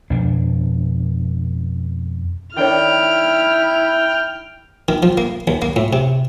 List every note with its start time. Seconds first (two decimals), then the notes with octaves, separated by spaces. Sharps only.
0.10 F2 B2 D4
2.57 D#3 D4 E4 C#5 G5 F6
4.88 D#3
5.03 F3
5.18 A#3
5.48 D#2
5.62 A#3
5.76 A2
5.93 C3